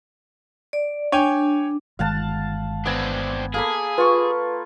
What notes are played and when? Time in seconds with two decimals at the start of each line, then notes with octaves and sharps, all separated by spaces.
0.73 D5
1.12 D4 C#5 G5 G#5
1.99 G1 D#3 G#3 F5 F#5 A5
2.86 B3 C4 D4 G#5
3.54 A#3 G#4 A4 B5
3.98 F4 B4 C#6